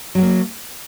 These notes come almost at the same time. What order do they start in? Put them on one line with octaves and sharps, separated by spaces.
F#3 G#3 A#3